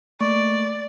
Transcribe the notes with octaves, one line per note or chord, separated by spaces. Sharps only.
A3 A#3 D5 C#6